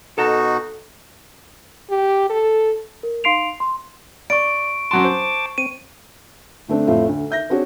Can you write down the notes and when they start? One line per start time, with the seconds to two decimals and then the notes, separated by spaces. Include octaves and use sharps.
0.18 B2 D#4 F#4 A4 A5 A#5
1.90 G4
2.30 A4
3.03 A#4
3.24 D#4 F5 C6 C7 D7 F7
3.60 C6
4.30 D5 C#6 D7
4.91 F#2 F#3 A5 C6 D6
5.04 C5
5.58 C4 D#7
6.68 D3 A3 C4 D4
6.87 F2 A2 A3 C4 F4
7.07 D2
7.30 E5 G6 A#6
7.50 C4 D4 F#4 G#4 C#5